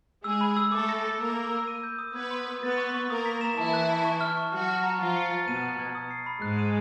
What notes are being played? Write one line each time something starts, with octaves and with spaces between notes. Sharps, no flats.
G#3 G#4 E6
B5
E6
A3 A4 D6
A#6
A#6
A#3 A#4 E6
E6
E6
D#7
G6
D#6
B3 B4 G#6
C6
D#6
B3 B4 A6
C#6
C#6
A#3 A#4 D#6
B6
E7
E3 E4 A5
F#6
A5
C#6
F6
C#6
F#3 F#4 F6
F6
A#5
F3 F4 C#6
C#7
A6
B2 B3 D#7
D#7
G#6
D#6
C7
B5
G#2 G#3 F#6
D#7